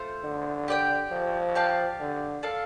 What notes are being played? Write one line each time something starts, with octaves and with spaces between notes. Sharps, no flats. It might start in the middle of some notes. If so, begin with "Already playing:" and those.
Already playing: A3 F4 C5
D3
G4 D5 G5
F3
G4 D5 F5 A5
D3
D4 A4 F5